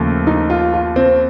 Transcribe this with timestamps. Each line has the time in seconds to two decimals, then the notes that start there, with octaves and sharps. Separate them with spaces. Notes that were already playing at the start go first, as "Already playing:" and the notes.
Already playing: D#2 C#3 F3 A3
0.27 D#4
0.50 F4
0.74 F4
0.96 C4